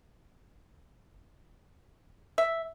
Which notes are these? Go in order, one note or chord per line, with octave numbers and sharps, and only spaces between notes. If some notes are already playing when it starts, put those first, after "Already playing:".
E5